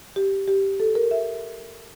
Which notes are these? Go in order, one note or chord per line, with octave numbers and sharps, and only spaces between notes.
G4
G4
A4
A#4
E5